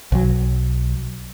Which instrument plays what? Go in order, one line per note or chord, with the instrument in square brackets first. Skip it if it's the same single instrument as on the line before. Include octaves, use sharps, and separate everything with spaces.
[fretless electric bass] B1 F#3